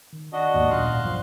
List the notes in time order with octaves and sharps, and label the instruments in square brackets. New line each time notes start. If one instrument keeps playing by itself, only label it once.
[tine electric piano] D#3
[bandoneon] D4 F#4 D#5
[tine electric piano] D#2 G#2
[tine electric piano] B1 A#2 [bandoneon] F5 C6 F#6
[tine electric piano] G2 F3